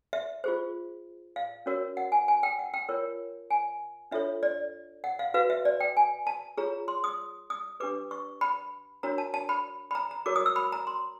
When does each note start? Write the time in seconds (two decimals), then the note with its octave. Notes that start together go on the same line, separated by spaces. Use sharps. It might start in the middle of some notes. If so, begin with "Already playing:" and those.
0.13 E5
0.44 F4 G#4 C5
1.36 F5
1.66 C#4 F#4 A#4 C#5
1.97 F#5
2.12 G#5
2.28 G#5
2.43 G5
2.59 F#5
2.74 G5
2.89 F4 A#4 C#5
3.51 G#5
4.11 D4 F4 A4 C#5 E5
4.43 D5
5.04 F#5
5.19 F5
5.34 F#4 B4 F5
5.50 E5
5.65 D5
5.80 G5
5.97 G#5
6.27 A5
6.58 F4 G#4 C#5 A#5
6.88 C6
7.04 D#6
7.50 D#6
7.80 D4 G4 B4 D6
8.11 C#6
8.41 B5
9.03 D4 F#4 A#4 C#5 A#5
9.18 A5
9.34 A5
9.49 B5
9.91 B5
9.95 A#5
10.11 A#5
10.26 F#4 A#4 C#5 D6
10.36 D#6
10.46 E6
10.56 B5
10.72 A#5
10.87 C6